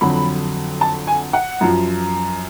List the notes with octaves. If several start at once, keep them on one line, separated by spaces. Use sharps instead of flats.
F2 D3 F#3 B5
A5
G#5
F#5
F#2 F3